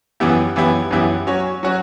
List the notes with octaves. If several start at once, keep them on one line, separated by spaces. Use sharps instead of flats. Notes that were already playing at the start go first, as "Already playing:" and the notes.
F#2 E3 B3 E4 G4
F#2 E3 B3 E4 G4
F#2 E3 B3 E4 G4
F#3 C#4 F#4 C#5
F#3 C#4 F#4 C#5